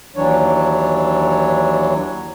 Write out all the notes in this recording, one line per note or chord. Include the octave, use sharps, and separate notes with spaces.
D#2 E3 F#3 D4 C#5